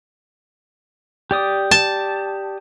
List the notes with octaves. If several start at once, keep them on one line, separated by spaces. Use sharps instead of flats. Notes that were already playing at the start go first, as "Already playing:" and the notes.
G4 D5 D#6
A5